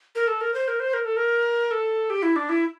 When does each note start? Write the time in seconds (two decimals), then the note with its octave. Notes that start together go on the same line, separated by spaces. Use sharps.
0.15 A#4
0.27 A4
0.41 A#4
0.54 C5
0.68 A#4
0.80 C5
0.94 A#4
1.05 A4
1.16 A#4
1.71 A4
2.10 G4
2.23 E4
2.36 D4
2.49 E4